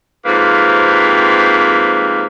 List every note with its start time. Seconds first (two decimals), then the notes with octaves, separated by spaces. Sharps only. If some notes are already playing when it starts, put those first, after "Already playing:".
0.25 F2 G#2 C3 A#3 B4